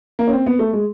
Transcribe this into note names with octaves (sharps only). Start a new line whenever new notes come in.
A#3
C#4
C4
B3
A3
G#3